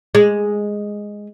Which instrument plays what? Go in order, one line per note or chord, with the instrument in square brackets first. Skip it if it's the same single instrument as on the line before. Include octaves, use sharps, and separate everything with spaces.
[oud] G#3